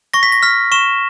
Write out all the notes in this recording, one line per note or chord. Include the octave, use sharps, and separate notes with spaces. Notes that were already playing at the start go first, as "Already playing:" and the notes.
C#6 A#6
B6
A#6
F6 B6
C#6 E7